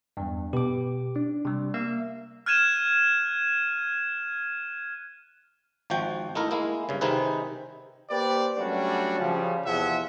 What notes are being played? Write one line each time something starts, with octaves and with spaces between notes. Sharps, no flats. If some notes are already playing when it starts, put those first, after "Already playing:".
E2 G2
B2 G4 D6
D4
C3 G3
A#3 E5
F6 F#6 G#6 D#7 E7
G#1 F3 F#4 G5
A3 D#4 E4 A#4
G#3 A#3 E4
G2 C#3
C3 D#3 C4 D#4 G#4 B4
A#3 G4 B4 C5 D5
F#3 G3 A3 C#4 D4 F#4
C#3 F3 G3
E2 C3 F3 G#4 E5 F#5